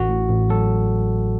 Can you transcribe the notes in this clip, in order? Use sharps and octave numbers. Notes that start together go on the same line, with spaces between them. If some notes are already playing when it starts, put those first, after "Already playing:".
Already playing: A1 F#4
A2
A1
F#3 A4